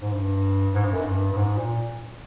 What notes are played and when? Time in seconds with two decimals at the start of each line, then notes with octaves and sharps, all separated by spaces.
0.02 G#2
0.12 G2
0.74 G#2
0.84 G2
0.94 F#2
1.04 G2
1.32 G2
1.37 G#2
1.58 A#2